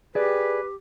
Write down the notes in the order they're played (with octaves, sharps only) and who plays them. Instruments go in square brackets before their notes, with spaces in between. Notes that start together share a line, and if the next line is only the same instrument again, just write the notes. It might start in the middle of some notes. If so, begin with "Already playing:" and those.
[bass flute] G4 [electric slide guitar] G#4 D5 [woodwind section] B4